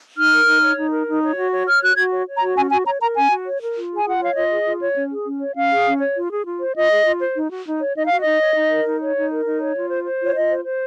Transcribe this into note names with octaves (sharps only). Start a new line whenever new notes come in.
D#4 F6
A#4
D#4
C#5
D#4
A#4
D#4
C#5
F#4
C#5
C#5 F6
F#4 F#6
F#4 G#6
C#5
C#5
A#5
F#4
C#4 G#5
F#4 G#5
C#5 A#5
A#4 A#5
C#4 G#5
F#4
C#5
A#4
F4
G#4
G#5
F4 F#5
C#5 F5
F4 D#5
G#4
F4
C#5
C#4
G#4
C#4
C#5
C#4 F5
G#4
C#4
C#5
F4
G#4
F4
C5
F4 D#5
G#4
F4
C5
D#4
F#4
D#4
C#5
D#4 D#5
F#4 F5
D#5
D#4
C#5
D#4
A#4
D#4
C#5
D#4
A#4
D#4
C#5
F4
C5
C5
F4 C#5
F4 D#5
C5
C5